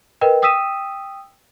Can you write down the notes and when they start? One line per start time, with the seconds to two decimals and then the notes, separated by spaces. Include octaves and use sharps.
0.21 A#4 B4 D#5 G5
0.42 G5 D#6 E6 B6 D#7 E7